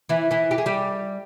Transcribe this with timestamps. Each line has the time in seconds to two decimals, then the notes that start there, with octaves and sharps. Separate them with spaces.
0.09 E3 E4
0.31 E3 E4
0.51 G4
0.58 G#4
0.66 G3 G4